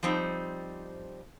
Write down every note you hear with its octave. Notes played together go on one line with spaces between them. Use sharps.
F3 G3 C4 D#4